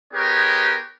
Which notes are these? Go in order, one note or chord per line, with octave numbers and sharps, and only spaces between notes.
B3 D#4 G4 G#4 A#4 C#5